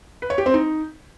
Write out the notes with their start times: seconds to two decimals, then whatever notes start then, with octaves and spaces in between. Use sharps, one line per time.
0.22 B4
0.30 C#5
0.38 G4
0.46 C4
0.54 D#4